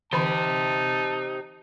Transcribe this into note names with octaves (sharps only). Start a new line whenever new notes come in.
D3 E3 D#4 G4 C5 A5 C6